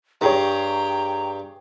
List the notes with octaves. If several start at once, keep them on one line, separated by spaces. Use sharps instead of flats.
G2 G4 G#4 C#5 G5 A#5